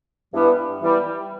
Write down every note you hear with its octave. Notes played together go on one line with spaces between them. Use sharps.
G2 E3 G3 B3
E3 G3 B3